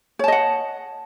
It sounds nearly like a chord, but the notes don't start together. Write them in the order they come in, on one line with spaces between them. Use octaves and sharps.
C#5 A5 D#5 F#5